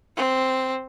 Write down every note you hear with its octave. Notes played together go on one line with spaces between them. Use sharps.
C4